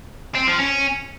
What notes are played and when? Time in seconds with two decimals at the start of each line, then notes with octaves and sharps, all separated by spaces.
0.35 C4
0.47 F3
0.59 C#4